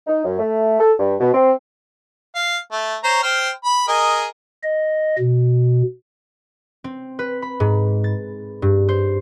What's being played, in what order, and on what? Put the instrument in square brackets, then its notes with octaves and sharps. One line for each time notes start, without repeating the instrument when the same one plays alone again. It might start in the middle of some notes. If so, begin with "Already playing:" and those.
[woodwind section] D#4
F#2
A3
A4
G2
B2
C4
[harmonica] F5
A3
C5 C#5 A#5
C5 G5 F6
B5
G#4 A#4 D#5
[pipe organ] D#5
B2
[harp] C4
B4
B5
G#2
A6
G2
C5